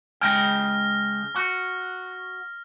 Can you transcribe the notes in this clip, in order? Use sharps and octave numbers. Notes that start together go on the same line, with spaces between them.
C#3 G#3 G5 F6 A#6
F#4